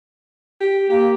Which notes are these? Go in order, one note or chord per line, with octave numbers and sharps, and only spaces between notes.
G4
A#3 G4